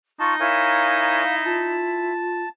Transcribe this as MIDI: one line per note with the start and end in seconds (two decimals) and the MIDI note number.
0.20 1.87 63
0.20 0.35 65
0.20 0.35 81
0.20 0.33 85
0.40 2.13 64
0.40 1.24 70
0.40 1.24 73
0.40 1.36 77
0.40 1.24 80
1.45 2.42 65
1.45 2.49 81